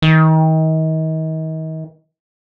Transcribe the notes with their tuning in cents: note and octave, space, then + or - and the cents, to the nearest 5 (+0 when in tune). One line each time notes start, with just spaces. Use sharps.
D#3 +35